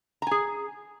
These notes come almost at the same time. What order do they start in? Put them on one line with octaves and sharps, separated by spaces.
A#5 G#5 G#4